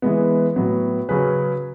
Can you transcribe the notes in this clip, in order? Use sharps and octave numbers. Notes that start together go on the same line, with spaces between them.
E3 G#3 B3
A2 F#3 B3
C#3 F#3 C#4 G#4 B4